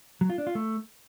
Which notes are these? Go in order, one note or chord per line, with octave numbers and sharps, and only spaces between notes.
F#3
F4
D4
F4
A3